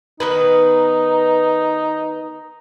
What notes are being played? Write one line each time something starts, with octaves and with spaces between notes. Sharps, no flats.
D#3 B3 D#4 B4